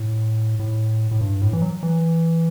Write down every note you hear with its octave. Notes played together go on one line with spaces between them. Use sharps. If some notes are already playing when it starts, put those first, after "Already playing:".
Already playing: A2
A2
A2
G2
A2
E3
F#3
E3